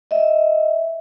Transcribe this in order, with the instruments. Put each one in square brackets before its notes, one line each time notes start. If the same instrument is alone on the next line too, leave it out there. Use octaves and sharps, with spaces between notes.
[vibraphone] D#5 E5